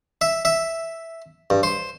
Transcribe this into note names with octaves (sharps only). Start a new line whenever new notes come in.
E5
E5
G2
C5